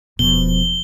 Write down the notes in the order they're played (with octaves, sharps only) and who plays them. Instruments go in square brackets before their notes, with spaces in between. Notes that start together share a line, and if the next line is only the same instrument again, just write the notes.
[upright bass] E1 [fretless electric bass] B2 [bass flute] F3 [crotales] G7